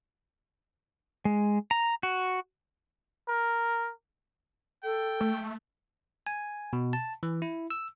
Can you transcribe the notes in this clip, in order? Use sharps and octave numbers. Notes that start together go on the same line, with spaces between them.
G#3
A#5
F#4
A#4
A4 G5
A3
G#5
B2
A5
E3
E4
E6